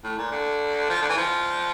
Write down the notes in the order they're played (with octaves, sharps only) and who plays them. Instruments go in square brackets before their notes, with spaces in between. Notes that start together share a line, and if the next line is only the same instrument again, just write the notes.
[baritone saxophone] A2
A#2
D3
F3
D3
E3
F3